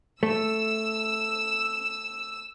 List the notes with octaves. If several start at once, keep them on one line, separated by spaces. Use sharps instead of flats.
A3 E6